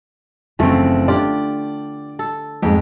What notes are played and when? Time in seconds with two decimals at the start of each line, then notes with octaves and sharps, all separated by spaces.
0.59 F#1 E3 F3 A3 C4
1.08 D3 F4 G4 D5
2.19 A4
2.63 F2 G#2 G#3